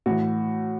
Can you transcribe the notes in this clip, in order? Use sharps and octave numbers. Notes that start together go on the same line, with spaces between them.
A2 E3 F#4